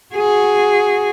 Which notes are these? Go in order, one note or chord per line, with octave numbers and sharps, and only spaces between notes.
F#4 G#4